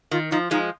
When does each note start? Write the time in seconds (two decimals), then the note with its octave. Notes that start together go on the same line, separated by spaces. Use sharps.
0.11 D#3 F4
0.31 F3 D#4
0.51 F3 G#3 D#4